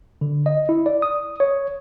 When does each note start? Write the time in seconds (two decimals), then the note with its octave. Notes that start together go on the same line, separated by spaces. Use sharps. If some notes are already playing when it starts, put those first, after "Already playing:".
0.21 D3
0.46 D#5
0.69 E4
0.86 D5
1.02 D#6
1.40 C#5